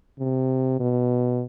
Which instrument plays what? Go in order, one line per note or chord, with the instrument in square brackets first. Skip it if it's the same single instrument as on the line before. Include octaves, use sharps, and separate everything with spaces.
[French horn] C3
B2